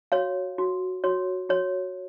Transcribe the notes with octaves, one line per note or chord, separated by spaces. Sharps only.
F#4 C#5 F5
F#4
F#4 C#5
F#4 C#5